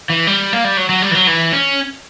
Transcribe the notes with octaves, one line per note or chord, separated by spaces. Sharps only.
E3
G3
A#3
G3
F#3
F#3
G3
E3
F#3
E3
C#4